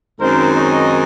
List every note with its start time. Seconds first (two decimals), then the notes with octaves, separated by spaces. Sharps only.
0.20 F#2 D#3 G#3 C4 D#4 A#4 C5
0.56 C#5 D#5